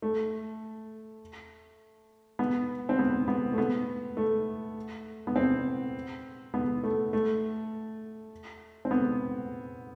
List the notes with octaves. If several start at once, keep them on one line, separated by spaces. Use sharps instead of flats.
A3
B3
C4
B3
B3
A3
B3
A3
B3
C4
B3
A3
A3
C4
B3